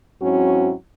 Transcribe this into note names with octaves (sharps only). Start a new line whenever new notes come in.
G#2 F#3 C4 C#4 E4 F#4